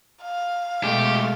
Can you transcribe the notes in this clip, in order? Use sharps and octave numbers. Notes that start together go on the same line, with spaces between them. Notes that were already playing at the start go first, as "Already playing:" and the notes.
F5
B2 G#3 A3 G4